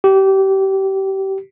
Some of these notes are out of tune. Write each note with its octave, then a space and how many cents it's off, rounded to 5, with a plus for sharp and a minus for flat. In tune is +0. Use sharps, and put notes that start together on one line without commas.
G4 -25